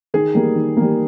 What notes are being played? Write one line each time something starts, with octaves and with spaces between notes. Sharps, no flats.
D#3 G#4
G3 A#3
D#3
G3 A#3